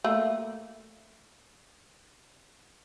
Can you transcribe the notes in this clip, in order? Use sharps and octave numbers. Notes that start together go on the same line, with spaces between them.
A3 A#3